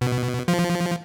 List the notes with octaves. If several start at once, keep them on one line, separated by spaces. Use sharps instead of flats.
B2
F3